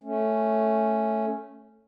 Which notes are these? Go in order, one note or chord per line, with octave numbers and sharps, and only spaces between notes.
A3 C#4